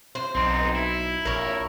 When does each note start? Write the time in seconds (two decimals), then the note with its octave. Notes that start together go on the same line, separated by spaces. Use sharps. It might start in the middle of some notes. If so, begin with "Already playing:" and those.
0.15 C5
0.35 B1 C4 D#4
0.75 E4
1.25 A#1 A#4 C#5